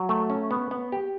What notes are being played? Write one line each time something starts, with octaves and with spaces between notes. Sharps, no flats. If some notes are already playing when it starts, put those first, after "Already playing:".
Already playing: F#3
A3
C#4
B3
B3
G4